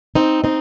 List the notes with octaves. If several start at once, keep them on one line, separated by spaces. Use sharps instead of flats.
C4 D#4
C4 D#4